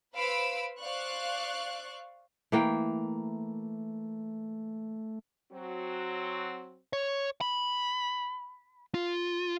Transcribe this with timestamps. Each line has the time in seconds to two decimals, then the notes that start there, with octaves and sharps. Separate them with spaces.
0.15 B4 C5 F5 B5 E6 D7
0.80 C5 D5 F5 C#6 F#6
2.52 E3 A3 A#3 G5
5.52 F#3 C4 F#4
6.93 C#5
7.41 B5
8.94 F4